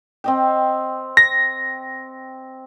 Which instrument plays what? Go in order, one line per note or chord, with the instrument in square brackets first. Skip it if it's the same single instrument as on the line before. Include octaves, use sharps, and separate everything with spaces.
[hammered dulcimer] C4 D#5 G5
[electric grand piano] A#6